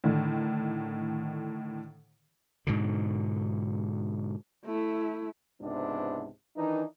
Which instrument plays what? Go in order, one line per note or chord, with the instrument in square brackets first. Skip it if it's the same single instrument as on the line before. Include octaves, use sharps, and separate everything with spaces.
[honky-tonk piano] A2 D3 D#3
[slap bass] G#2 B2 D3
[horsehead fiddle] A3 E4
[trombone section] C#2 G#2 C3 B3 D4
D#3 E3 D4 D#4